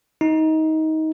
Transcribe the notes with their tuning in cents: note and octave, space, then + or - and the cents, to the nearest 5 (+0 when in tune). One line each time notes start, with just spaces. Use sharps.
D#4 +20